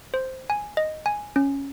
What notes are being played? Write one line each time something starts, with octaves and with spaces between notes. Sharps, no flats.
C5
G#5
D#5
G#5
C#4